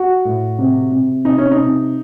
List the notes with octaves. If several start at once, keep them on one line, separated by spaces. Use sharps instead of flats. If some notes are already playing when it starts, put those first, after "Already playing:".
Already playing: F#4
A2
C3
C3
C3 D#4
C#4
D#4
C3